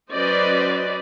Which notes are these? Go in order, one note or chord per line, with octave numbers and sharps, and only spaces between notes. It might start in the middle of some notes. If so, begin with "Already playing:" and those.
F#3 C#4 B4 C5 D5 D#5